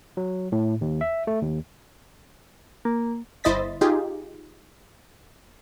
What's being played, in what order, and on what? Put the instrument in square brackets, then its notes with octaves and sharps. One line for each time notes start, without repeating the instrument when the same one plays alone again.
[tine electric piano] F#3
A2
D#2
E5
A3
D#2
[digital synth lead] A#3
[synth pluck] G1 E4 C5 D#5 A6 B6
D#4 F4 G4 G#4